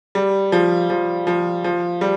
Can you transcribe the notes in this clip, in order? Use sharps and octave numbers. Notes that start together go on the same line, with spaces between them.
G3
F3
F3
F3
F3
G3